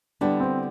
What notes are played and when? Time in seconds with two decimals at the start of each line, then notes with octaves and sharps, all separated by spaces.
0.21 D3 G3 B3 D4 E4 G4
0.40 C4